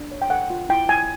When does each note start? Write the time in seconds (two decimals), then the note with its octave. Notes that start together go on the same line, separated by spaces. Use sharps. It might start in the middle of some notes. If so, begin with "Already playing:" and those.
Already playing: D4
0.11 C#5
0.22 G5
0.30 A4 F#5
0.50 F4
0.69 E4 G5
0.89 E4 G#5